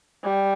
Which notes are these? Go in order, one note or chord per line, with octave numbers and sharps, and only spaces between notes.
G3